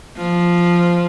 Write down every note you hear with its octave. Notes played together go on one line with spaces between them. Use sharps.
F3